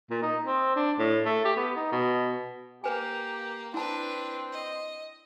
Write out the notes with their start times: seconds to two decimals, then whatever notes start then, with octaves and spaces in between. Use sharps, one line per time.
0.10 A#2
0.22 D#4
0.46 C4
0.76 D4
0.99 A2
1.25 A3
1.45 G4
1.57 B3
1.76 D#4
1.92 B2
2.84 A#3 G4 B4 G#5
3.74 C4 D4 E4 B4 A5
4.52 D#5